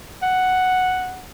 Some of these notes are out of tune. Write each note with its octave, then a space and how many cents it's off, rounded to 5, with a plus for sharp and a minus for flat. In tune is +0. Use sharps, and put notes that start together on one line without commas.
F#5 +0